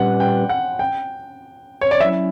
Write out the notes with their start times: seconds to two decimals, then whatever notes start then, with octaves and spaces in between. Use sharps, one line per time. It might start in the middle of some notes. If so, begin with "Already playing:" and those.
Already playing: A#2 G3 C#4 G4 B4 F#5
0.20 G5
0.49 F#5
0.79 G5
1.81 C#5
1.91 D5
2.00 F#3 C#4 E4 E5